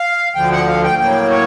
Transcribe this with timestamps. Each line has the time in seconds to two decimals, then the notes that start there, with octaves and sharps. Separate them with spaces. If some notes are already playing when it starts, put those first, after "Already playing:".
Already playing: F5
0.35 D2 D3 F3 G5
0.52 F#5
0.67 F5
0.84 G5
0.99 A2 F#3 A#3 G5
1.31 C#5